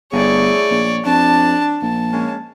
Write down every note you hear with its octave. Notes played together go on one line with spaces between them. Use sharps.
G1 A3 E4 G#4 C#5 D5
A#1
F2 D4 A5
A#1 A5
G#3 A#3 C#4